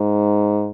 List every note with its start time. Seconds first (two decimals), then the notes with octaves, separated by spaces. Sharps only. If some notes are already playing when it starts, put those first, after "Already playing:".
Already playing: G#2